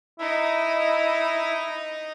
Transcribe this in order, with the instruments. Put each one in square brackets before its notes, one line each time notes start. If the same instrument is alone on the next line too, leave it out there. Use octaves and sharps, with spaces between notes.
[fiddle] D#4 D#5 [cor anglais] E4